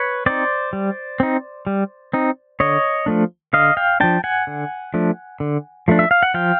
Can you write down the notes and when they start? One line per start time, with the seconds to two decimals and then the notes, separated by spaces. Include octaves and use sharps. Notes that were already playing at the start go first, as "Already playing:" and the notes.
Already playing: B4 C#5
0.26 C4 D#4 C5 D5
0.73 G3
1.20 C4 D#4
1.67 G3
2.13 C4 D#4
2.60 D3 C#5 D#5
3.06 F3 A3 D4
3.53 D3 D#5 F5
3.77 F5 G5
4.00 F3 A3 D4 G5 A5
4.24 F#5 G#5
4.47 D3
4.94 F3 A3 D4
5.40 D3
5.88 F3 A3 D4
5.99 E5
6.11 F5
6.23 F#5
6.34 F3 F5 G5